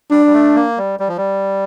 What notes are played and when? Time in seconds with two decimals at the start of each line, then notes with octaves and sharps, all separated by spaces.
0.11 G3 D4
0.26 G3
0.33 A3
0.55 A#3
0.78 G3
1.00 G3
1.08 F3
1.17 G3